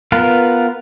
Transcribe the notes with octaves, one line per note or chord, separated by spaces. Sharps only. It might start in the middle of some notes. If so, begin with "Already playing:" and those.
B3 F4 A#4 B4